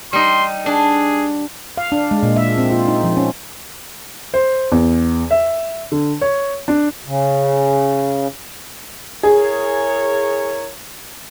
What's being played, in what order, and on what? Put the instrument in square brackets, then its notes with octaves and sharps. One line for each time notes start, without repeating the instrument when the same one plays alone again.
[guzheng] G3 D#4 [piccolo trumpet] C6
[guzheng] D4 [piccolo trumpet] G#4
[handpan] F5
D4
G#3
A#2
E5
C4
F4
D#4
F3
C#4
[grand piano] C5
E2
E5
D3
C#5
D4
[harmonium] C#3
[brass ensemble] E4 A#4 C#5 [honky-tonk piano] G#4